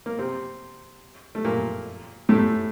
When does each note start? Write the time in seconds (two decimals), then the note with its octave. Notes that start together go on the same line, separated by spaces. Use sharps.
0.06 A#3
0.19 C3 C4
1.35 A3
1.45 A#2 A#3
2.29 A2 A3